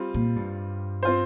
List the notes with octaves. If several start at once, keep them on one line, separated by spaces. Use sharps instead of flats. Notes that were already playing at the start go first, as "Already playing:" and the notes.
Already playing: G3 C4 F4
A#2
G2
C4 F4 C5